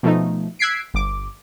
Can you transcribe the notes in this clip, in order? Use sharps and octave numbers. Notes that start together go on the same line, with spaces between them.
B2 F3 A3 D#4
E6 F#6 G#6 B6 C7 D7
G1 D6